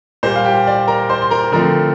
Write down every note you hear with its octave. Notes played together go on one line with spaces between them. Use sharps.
A#2 G3 A#3 C5 C6
F5
G4 G5
D5
A#4 A#5
C5 C6
C6
A#4 A#5
D3 F3 A3 C4 A#4 A#5